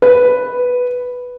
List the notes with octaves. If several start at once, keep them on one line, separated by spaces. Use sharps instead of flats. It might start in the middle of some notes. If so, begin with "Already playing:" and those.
B4